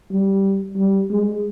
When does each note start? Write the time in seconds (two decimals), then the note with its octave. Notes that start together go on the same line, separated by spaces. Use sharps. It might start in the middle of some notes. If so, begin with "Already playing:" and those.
0.11 G3
0.77 G3
1.11 G#3